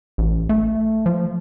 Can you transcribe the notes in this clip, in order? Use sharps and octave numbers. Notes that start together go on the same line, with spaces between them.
A1
A3
F3